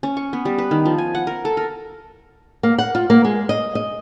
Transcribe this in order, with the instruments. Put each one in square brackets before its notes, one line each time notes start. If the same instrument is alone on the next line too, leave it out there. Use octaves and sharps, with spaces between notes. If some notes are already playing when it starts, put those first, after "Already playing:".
[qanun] C#4
C#6
B3
G3
B4
D#3
F3
G#5
F#5
A#4
A4
A#4
[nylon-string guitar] A#3
F#5
F4
A#3
G#3
D#5
D#5